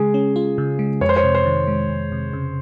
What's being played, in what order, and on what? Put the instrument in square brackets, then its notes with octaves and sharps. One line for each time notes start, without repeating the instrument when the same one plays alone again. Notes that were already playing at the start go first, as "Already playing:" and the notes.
Already playing: [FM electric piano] C#3 G#3 [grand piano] G#4
[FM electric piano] C#4
F4
C#3
G#3
[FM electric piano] F2 [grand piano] C#5
[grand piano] C5
C#5
[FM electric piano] C3
[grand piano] C5
[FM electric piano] D#3
G#3
F2
C3
C#3